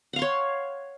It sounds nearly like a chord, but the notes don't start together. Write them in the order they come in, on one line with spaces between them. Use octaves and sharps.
F#5 F5 C6 C#5